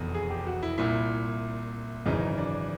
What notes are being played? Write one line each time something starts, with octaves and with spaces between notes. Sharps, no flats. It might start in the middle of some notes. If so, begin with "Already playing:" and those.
Already playing: F1 E2 B2
G#4
G4
F#4
E4
C2 A#2 E4
G#1 F#2 C#3 E3 D#4
D4